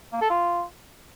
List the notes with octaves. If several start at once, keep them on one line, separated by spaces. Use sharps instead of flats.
A#3
A4
F4